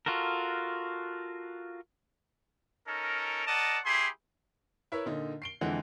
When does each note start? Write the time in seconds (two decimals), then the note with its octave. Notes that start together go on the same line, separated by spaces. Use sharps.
0.06 F4 F#4 A4 A#4
2.88 C#4 D#4 A4 A#4
3.47 A#4 D5 D#5 F#5 A5
3.85 E4 G4 G#4 B5 C6
4.92 E4 A#4 B4 C#5 E5
5.06 A#2 D3 D#4
5.42 C7 D7 G7
5.61 F2 D3 E3 G#3 F#5